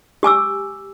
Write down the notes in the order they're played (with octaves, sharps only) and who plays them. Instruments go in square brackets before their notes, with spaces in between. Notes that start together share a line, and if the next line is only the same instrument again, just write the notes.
[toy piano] G4 G#5 D6 E6